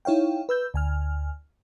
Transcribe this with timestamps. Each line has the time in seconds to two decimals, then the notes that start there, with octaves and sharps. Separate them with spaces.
0.05 D#4 E4 C#5 F5 G5
0.49 B4 E6 G6
0.74 D2 G#5 F6